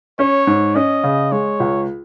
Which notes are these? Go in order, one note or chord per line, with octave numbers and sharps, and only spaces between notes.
C#4 C#5
G#2
C#4 D#5
C#3
G#3 C#5
C#2